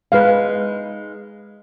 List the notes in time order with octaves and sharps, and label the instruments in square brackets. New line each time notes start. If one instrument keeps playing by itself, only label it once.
[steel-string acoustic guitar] G#3 D#4 [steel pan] B4 F5